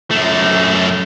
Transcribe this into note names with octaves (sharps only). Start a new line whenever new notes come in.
F#2 A3